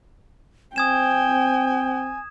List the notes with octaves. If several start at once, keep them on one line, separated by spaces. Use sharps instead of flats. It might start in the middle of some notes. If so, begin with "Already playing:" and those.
C4 G5 G#5 D#6 G#6 E7